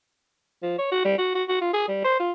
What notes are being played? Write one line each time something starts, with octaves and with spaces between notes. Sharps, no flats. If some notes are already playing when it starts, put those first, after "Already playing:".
F3
C#5
F#4
G3
F#4
F#4
F#4
F4
G#4
G3
C5
F4